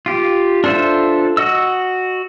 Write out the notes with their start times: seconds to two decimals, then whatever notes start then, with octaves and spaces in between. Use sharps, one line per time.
0.06 F4 G4
0.64 D4 F4 A4 C5 E5
1.37 F#4 D#5 E6